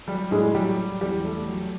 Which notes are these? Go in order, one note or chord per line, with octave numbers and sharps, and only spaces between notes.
F#3 G3 G4
A2 G#3 G#4
F#3 G3 G4
F#3
E2 G3 G4
A3
F#3